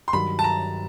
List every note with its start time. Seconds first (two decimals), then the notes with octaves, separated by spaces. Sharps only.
0.08 C6
0.13 G2 D#3 F#3 B5
0.39 A5
0.44 A#5